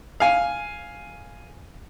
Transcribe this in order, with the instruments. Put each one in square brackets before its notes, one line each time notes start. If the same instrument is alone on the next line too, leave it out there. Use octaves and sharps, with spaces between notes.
[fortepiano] F5 G#5